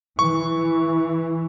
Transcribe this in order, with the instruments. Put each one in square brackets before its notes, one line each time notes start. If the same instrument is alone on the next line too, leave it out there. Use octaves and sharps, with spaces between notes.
[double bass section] E3 [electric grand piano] C#6